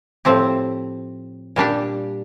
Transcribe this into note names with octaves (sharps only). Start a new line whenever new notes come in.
A2 F3 C4 G4
A#2 G3 D4 G4